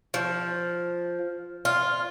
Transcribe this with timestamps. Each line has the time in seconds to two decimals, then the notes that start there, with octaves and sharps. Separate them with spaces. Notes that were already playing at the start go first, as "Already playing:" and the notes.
0.14 F3
1.65 F4